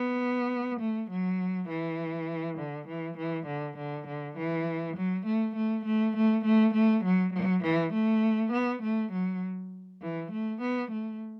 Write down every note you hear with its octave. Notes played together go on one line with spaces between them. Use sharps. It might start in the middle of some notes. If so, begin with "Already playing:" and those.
Already playing: B3
A3
F#3
E3
D3
E3
E3
D3
D3
D3
E3
F#3
A3
A3
A3
A3
A3
A3
F#3
F#3
E3
A3
B3
A3
F#3
E3
A3
B3
A3